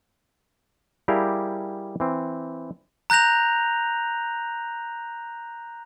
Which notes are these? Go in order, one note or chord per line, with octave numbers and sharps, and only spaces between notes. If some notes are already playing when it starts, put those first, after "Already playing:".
G3 E4 G4 G#4 A#4 F5
E3 C4
A#5 F#6 G6 A#6 F7